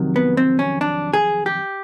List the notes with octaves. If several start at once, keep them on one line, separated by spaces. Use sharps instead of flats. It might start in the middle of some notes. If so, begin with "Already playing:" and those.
Already playing: F2 C3 D#3 F#3
B3
C4
C#4
D4
G#4
G4